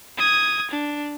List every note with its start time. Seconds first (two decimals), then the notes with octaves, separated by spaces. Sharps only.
0.18 D#6 G#6
0.71 D4